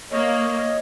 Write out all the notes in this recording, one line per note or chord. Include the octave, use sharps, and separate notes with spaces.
A#3 C#5 D#5